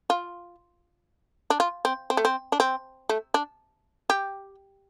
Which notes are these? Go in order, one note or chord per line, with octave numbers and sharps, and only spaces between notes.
F4
D4
F4
C4
C4
A3
C4
D4
C4
A3
D4
G4